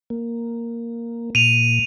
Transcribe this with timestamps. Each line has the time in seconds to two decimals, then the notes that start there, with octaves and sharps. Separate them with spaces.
0.10 A#3
1.35 A#2 D#7 F7